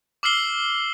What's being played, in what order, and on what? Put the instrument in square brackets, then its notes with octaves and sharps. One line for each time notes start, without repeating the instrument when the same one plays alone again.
[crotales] D6 E6 F6 C7 G7